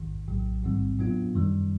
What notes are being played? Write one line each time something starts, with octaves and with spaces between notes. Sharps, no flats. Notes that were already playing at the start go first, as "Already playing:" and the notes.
Already playing: A1 G#2 D#3
A#1 A2 F#3
A1 G#2 D#3 G3 C4
A2 F#3 B3 D4 F4
F#2 D#3 G3